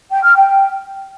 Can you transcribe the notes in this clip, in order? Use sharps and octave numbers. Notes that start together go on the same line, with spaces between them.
G5
F6
G5